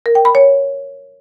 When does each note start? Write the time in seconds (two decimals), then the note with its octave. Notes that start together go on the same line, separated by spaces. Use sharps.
0.06 A#4
0.15 G5
0.25 B5
0.35 C#5